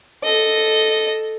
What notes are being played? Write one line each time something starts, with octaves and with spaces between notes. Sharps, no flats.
A4 D#5